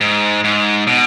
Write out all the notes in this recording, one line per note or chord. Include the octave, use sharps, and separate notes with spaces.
G#2
G#2
B2